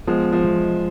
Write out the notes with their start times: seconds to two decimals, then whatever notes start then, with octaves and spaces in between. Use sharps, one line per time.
0.07 F3 G#3 B3
0.33 F3
0.45 G#3